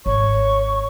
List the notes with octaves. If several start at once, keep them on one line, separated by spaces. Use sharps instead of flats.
G#1 C#5 C#6